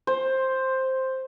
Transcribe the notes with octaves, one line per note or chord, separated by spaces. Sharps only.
C5